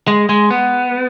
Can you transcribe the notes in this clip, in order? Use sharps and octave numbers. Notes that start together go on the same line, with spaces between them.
G#3
G#3
B3